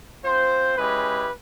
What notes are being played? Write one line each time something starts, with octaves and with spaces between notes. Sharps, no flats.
C4 F4 C5
G#3 C#4 E4 G4 B4